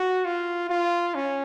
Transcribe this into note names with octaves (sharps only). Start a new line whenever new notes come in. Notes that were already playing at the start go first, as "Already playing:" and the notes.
Already playing: F#4
F4
F4
C#4